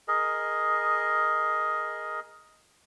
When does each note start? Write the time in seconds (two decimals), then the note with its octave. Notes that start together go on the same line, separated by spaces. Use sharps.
0.08 G#4 A#4 D#5